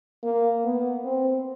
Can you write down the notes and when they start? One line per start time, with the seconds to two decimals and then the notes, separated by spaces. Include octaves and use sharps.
0.24 A#3
0.65 B3
1.04 C4